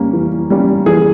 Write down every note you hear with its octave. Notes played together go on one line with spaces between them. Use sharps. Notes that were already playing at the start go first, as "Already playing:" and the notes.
Already playing: G3 A#3 C#4
E3
G3 A#3 C#4
E3 G#4